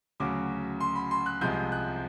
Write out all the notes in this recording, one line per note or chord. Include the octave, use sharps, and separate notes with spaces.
D2 C#3 F#3 D6
C6
B5
C6
F#6
C2 C3 F3 G#3 G6
F#6